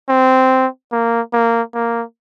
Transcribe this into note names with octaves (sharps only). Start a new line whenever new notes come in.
C4
A#3
A#3
A#3